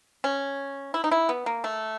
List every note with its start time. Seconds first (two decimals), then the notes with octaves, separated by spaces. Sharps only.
0.24 C#4
0.94 E4
1.04 D#4
1.11 E4
1.29 B3
1.46 A#3
1.64 A3